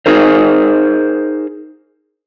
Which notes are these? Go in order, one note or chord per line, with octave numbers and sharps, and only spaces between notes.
D#4 G#4 A#4 C5